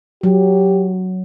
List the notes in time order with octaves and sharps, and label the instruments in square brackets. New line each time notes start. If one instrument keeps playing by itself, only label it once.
[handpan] F#3 [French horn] G4